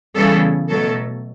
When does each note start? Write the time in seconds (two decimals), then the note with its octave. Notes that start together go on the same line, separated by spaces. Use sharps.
0.15 C#3 E3 G3 B3 A4
0.70 B2 F#3 A3 A4